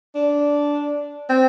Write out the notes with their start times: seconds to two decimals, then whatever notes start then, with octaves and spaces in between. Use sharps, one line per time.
0.15 D4
1.29 C4